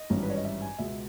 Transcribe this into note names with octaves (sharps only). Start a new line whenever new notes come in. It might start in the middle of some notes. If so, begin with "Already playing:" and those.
Already playing: D#5
G#1 G2 E3 G3 C#4
B4
C#5
D#5
E5
G#5
C#2 B2 G#3 E5